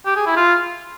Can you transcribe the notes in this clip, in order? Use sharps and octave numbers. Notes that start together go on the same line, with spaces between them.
G4
G#4
E4
F4